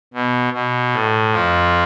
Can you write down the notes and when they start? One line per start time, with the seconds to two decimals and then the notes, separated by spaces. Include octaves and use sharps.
0.14 B2
0.53 B2
0.93 A2
1.32 F2 F3